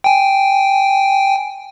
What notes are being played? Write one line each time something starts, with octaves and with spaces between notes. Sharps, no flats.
G5 G#5